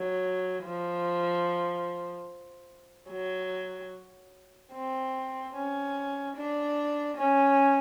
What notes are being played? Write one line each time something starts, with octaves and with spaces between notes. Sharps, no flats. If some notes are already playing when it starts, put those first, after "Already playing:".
Already playing: F#3
F3
F#3
C4
C#4
D4
C#4